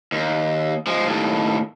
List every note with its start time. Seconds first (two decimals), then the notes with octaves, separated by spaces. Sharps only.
0.12 D#2
0.87 F3 G#3
1.06 D#2 A2